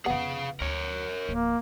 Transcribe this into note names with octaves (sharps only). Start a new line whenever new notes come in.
F2 C#3 B3 G#4 F5
D2 A#4 C#5
D1 F3 A#3